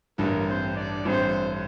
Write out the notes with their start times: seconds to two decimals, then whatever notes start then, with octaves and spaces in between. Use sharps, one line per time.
0.18 A1 G2 D3 A#3 A#4
0.47 C4 C5
0.76 D4 D5
1.05 A1 G2 D3 C4 C5